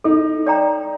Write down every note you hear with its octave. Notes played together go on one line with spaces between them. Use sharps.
D#4 A4
D5 G5 A#5